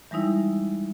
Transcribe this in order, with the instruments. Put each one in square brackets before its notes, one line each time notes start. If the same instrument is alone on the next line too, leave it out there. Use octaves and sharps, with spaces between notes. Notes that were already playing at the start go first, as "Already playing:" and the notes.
[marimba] E3 G3 G#3 D#4 E4